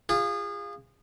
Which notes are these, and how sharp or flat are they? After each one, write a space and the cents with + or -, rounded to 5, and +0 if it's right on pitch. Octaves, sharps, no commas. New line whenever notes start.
F4 +0 G#4 -30